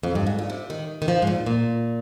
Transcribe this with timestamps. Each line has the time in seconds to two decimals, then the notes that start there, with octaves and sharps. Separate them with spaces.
0.03 F2
0.15 G2
0.27 G#2
0.39 A#2
0.50 C3
0.70 D#3
1.02 D#3
1.08 F3
1.22 G#2
1.27 A#2
1.46 A#2